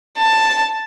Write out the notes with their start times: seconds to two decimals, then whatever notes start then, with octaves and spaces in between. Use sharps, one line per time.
0.18 A5